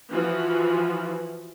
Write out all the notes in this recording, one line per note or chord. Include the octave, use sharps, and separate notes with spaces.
E3 F3 F#4